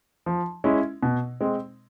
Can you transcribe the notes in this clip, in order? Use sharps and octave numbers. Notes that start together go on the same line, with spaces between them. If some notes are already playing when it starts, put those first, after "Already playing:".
F3
G#3 C#4 E4
B2
G#3 C4